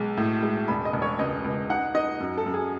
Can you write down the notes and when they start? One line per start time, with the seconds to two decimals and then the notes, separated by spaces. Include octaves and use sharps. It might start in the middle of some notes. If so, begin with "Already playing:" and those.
Already playing: B1 G#3
0.17 A2
0.42 G#3
0.68 E1 B5
0.85 D#5
0.93 E1
1.02 C#5
1.19 C#2 D#5
1.44 C#2
1.70 D#4 F#5
1.94 D#4 D#5
2.20 F#2
2.37 A4
2.46 F#2
2.54 G#4